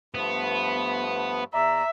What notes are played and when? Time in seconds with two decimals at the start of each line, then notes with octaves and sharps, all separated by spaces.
0.15 G2 F3 A3 B3
1.54 E2 D5 E5 A#5